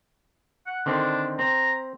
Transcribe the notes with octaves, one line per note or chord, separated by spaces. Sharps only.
F#5
D3 D#3 C4 D4
C4 A#5